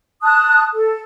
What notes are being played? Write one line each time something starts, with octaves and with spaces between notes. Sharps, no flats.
A5 D#6 F#6
A4